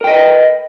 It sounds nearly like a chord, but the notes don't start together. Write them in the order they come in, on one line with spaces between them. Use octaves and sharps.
A#4 G5 D#5 B4